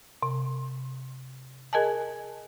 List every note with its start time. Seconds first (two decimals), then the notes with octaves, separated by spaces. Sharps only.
0.23 C3
1.73 G#4 A#4 D#5 G#5 A5